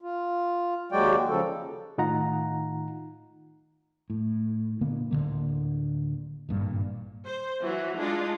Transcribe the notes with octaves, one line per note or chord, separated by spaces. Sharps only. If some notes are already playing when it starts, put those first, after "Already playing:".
F4
D#2 F#3 G#3 F#4 D5 G5
C#3 F3 A4
A2 D#3 D#4 F4 F#5 A#5
A2
A#2 D3 A#3 B3
D1 D#2 D3 A#3
G#1 G2 A#2
C5
E3 F#3 F#4
G#3 D4 D#4 F4 G#4